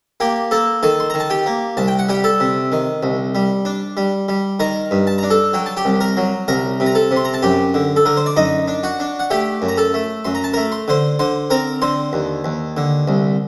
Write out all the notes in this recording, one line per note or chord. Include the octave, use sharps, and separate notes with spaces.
A#3 G4 G5
A#3 A4 A5
D#3 A4 A5
C6
D#3 A#5
A5
G4 G5
A#3
C2 A5
G5
F#5
G3 G4 G5
A4 A5
C3
D#3
C2
G3
D4
G3
G3
D#3 A#4 A#5
G2
A5
D4 A#5
A4 A5
F#3 G5
A5
G4 G5
C2
A#4 A#5
F#3
C2 A#4 A#5
C3
A#5
A4 A5
C3
C6
A#5
A5
F#2 G4 G5
D3
A4
D3 A#4
C5
D5
F#2 D#4 D#5
D4
F#4 F#5
D4
F#5
A3 G4 G5
F#2
A#5
A4 A5
A3
F#2 C6
A#5
A5
A3 A#4 A#5
C6
D3 C5 C6
D3 C5 C6
C4 A#4 A#5
D3 C5 C6
D#2
D#2
D3
C2